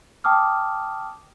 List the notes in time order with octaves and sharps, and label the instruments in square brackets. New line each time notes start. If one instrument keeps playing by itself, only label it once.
[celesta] G5 A5 D6 D#6 F6